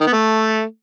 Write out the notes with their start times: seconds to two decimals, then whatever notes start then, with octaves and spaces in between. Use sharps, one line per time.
0.01 D#3
0.07 B3
0.13 A3